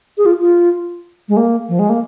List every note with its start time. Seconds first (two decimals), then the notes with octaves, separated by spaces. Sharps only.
0.18 G#4
0.26 F4
0.41 F4
1.29 G#3
1.37 A#3
1.69 F3
1.79 G#3
1.90 A#3